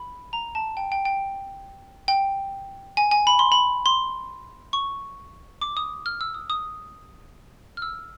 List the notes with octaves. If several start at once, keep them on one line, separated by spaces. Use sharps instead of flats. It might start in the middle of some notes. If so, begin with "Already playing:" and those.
Already playing: B5
A#5
A5
G5
G5
G5
G5
G#5
G#5
B5
C6
B5
C6
C#6
D6
D#6
F6
E6
D#6
D#6
F6
E6